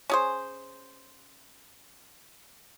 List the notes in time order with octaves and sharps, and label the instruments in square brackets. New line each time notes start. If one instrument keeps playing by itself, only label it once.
[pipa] C#4 G#4 C5